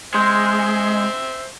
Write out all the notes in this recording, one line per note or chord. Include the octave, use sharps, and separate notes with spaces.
G#3 C5 E5 C6 G6